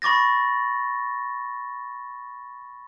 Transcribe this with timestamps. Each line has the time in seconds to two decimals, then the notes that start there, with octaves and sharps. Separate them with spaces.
0.02 B5 C#6 D6 A6 A#6